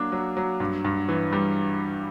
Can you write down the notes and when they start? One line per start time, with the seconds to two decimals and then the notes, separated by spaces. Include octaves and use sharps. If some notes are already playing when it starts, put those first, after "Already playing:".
Already playing: F#3 A#3 D4
0.12 F#3
0.37 F#3
0.60 G2
0.84 G2
1.09 E3
1.32 G3